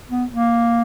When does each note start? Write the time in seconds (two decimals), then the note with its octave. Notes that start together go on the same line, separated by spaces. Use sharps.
0.10 B3
0.31 A#3